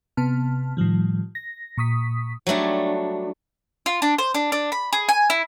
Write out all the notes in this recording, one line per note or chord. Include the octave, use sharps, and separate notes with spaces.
C3 B3 A5 F6
A2 D#3 F3 G3
A#6
A#2 C#6 D#6 B6
F#3 G3 A3 D4
F4
D4
C5
D4
D4
B5
G#4
G#5
E4